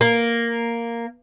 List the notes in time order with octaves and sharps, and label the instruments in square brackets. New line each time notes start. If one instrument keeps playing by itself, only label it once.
[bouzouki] A#3